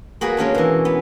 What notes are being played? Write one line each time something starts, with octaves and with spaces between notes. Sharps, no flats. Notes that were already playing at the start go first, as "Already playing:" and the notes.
A#3 F#4 G#4 B4
G#3 A#3 C#4 D4
B2 E3
B3